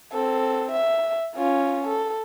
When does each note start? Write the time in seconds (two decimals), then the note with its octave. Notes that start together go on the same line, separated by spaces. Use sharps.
0.12 C4 A4
0.72 E5
1.36 C#4 F4
1.87 A4